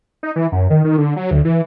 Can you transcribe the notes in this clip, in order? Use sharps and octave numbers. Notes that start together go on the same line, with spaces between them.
D#4
E3
F#2
D#3
D#3
D3
F#3
D2
E3